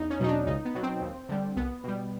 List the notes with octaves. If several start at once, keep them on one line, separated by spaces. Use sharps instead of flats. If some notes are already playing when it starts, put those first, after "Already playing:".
Already playing: E2 D#4
C#4
B2 F#3 D#4
D4
C#2 D#4
B3
B2 F#3
C4
D#2
D3 G3
C2 B3
B2 G3